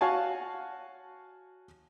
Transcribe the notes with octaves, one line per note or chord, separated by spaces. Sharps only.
F#4 C#5 F5 F#5 G#5 A5